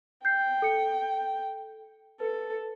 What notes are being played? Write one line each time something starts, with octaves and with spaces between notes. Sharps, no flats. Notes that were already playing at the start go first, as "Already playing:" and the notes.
G5 G6 C7
A4 C#7
A4 B4